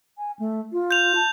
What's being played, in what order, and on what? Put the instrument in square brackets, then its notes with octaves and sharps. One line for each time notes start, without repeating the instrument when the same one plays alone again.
[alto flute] G#5
A3
F4
[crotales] G6 F7
[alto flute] A5